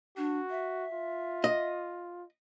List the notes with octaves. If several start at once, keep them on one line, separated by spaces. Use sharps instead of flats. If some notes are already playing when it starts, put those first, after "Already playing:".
D4 F#4
E5
F4
D#5